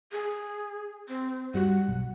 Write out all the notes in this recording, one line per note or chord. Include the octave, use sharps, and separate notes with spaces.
G#4
C4
G2 G3 F#4 F#5
B1